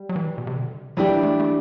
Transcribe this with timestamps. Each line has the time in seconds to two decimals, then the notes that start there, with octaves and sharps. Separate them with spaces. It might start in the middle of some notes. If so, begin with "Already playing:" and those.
Already playing: G3
0.09 F#3
0.16 E3
0.38 B2
0.47 C3
0.56 D3
0.97 E3 F#3 G3 D4 G4 D5
1.23 A3
1.40 A3